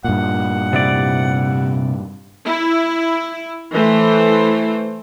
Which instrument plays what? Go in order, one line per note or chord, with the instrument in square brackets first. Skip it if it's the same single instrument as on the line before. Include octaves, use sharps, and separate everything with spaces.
[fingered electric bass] G2 A#2 [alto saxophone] F#5
[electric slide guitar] C3 E4 D5
[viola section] E4
E3 A3 C5